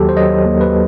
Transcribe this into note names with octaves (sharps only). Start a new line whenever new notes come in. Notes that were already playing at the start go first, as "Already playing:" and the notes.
Already playing: D#2 D#3 F#3 F#4 G4 A4
C5
F#3 D#5
D#2
B4